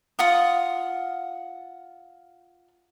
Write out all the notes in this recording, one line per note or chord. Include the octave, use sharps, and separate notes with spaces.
F4 F#5 D#6